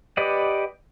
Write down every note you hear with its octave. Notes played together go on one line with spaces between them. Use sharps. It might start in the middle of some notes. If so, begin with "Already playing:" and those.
G4 B4 D5 D#5 F#5